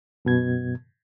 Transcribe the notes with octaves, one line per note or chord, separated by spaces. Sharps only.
F#2 B2 G#6